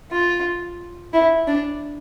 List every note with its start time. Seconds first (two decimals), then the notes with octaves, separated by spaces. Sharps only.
0.11 F4
1.13 E4
1.47 D4